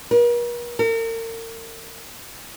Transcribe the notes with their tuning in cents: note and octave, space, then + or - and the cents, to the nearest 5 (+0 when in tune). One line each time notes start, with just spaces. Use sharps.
A#4 +45
A#4 -40